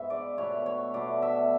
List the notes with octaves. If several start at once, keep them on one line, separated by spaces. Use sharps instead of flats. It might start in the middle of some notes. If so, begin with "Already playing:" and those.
Already playing: G#2 G#3 B3 E5
D5
B2 A3 C#5
C#5
B2 A3 D5
E5